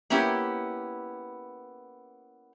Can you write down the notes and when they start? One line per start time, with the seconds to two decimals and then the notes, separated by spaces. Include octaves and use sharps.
0.10 A#3 B3 C#4 E4 G4